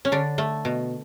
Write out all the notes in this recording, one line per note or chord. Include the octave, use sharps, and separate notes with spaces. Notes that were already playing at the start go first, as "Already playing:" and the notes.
C#4
D3 D4
A3
B2